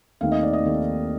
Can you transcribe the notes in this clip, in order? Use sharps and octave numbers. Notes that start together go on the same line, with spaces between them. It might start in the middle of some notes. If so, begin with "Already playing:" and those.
D#2 D#3 A3 C4 D#4 F5
D#5
D5
D#5
D#2 D#3 A3 C4 D#4